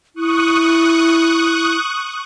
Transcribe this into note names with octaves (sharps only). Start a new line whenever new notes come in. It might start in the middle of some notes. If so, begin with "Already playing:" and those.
E4 C#6 D#6 F#6